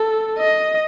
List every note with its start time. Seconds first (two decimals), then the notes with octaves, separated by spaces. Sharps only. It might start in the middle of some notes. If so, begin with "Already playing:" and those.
Already playing: A4
0.38 D#5